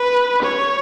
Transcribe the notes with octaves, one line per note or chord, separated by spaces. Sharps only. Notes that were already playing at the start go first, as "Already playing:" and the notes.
Already playing: B4
C#5